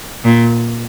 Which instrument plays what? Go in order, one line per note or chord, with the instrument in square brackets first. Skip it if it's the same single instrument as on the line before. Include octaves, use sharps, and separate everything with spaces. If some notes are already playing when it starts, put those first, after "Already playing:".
[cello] A#2